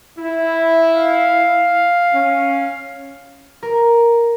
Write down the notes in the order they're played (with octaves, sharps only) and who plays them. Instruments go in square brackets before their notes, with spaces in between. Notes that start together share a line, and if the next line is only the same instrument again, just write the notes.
[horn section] E4
[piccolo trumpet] F5
[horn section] C#4
[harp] A#4